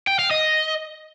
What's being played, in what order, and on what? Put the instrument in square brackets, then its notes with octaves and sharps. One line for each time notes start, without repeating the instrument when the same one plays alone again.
[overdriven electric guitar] G5
F5
D#5